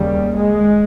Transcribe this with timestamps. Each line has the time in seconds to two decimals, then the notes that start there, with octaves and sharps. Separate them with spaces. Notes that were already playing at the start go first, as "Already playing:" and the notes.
Already playing: D#2 C#3 G3
0.35 G#3